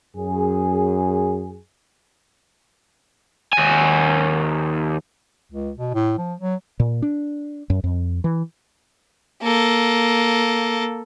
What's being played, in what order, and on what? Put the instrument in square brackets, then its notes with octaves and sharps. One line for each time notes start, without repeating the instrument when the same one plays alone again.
[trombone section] F#2 G#4
[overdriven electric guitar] D#2 G#5
[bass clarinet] C#2
B2
A2
F3
F#3
[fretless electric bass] A#2
D4
F#2
F2
E3
[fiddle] A#3 A4